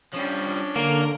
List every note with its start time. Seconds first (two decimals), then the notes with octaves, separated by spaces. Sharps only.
0.13 F3 G3 C#4 D4
0.76 D3 A#3 A#4